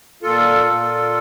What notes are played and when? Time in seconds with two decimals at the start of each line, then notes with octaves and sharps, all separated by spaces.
0.23 A#2 F4 A4
0.66 A#2